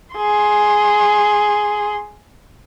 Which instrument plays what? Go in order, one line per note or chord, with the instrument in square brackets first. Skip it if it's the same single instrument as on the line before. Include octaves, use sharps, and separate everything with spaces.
[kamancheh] G#4 C6